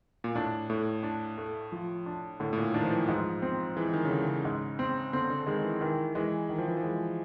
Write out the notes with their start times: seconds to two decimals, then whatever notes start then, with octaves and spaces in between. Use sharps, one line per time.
0.24 A#2
0.35 A2 D4
0.70 A2 A3
1.03 D4
1.38 A3
1.72 F3
2.06 D4
2.40 A2 D3
2.53 A2
2.58 A#2
2.74 D#3 D4
2.84 F3
2.91 E3
3.08 G#2 F3
3.42 C4
3.76 E3 G#3
3.93 D#3
4.05 C#3
4.11 D3 G#3
4.28 C#3
4.45 G#2
4.79 C4
5.13 D3 C4
5.30 D3
5.47 D#3 G#3
5.64 E3
5.81 D#3 E3
6.15 E3 G#3
6.49 D#3
6.58 F3
6.68 E3
6.77 F3
6.84 G#3